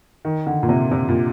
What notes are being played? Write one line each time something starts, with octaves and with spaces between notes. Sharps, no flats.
D#3
D3
A#2
C3
C3
A#2